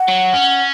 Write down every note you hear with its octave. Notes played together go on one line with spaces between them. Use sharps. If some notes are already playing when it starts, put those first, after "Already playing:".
Already playing: F#5
F#3
C#4